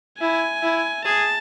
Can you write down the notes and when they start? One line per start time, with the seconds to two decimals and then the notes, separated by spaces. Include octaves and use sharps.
0.20 E4 G#5
0.63 E4
1.05 G#4 A5